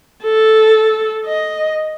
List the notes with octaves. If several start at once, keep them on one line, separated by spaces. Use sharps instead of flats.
A4
D#5